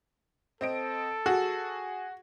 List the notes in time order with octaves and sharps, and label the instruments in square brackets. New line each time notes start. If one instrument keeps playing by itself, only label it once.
[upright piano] C4 D#5 D7 [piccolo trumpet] A4
[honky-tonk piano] F#4 [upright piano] G#4